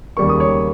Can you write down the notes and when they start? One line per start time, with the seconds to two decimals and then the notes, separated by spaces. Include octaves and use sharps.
0.17 D#2 C#3 G3 A#3 C#6
0.29 D#6
0.40 C#5 C#6